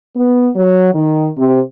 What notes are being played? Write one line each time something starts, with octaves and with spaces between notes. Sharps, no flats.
B3
F#3
D#3
C3